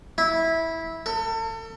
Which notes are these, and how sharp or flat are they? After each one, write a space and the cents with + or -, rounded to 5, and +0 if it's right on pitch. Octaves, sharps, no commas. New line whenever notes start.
E4 -15
A4 +35